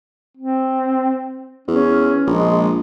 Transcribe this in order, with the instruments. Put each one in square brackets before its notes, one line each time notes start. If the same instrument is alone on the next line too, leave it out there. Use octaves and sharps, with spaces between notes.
[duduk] C4
[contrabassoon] E2 [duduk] C#4
[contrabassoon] A#1 [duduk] G#3